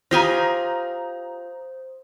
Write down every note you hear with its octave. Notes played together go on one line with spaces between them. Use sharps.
F4 G4 C5 G#5 A#5 D#6 A#6